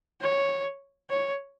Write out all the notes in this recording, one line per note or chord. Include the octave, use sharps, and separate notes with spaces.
C#5
C#5